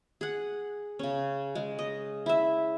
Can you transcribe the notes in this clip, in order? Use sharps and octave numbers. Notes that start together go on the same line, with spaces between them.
G#4 F#5
C#3 C#4
G#3
D#5
E4 E5